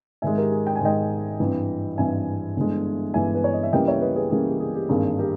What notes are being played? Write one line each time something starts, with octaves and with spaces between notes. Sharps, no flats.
G#2 D#3 G#3 E5 G#5
G4 A#4
G#4
G5
G#5
G#2 D#3 G#3 D#5 G5
G#1 G2 E3
G#1 G2 E3 E5 G#5
G1 G2 E3 G#3
G1 G2 E3 G#3 E5 G#5
B4
C#5
D#5
E5
C#2 C#3 E3 G3 A#3 D#5 G5
C#5 E5
B4 D#5
G#4 B4
C#2 C#3 E3 G3 A#3 G#4
G4
G#4
G4
G#1 G2 D#3 A#3 G#4
G4 A#4